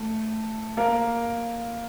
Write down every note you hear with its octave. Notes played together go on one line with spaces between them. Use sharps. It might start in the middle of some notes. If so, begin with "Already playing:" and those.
Already playing: A3
A#3 A#4